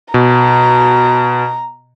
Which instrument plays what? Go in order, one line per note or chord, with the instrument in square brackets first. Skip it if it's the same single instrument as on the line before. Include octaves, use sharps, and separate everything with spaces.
[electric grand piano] B2 [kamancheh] A#5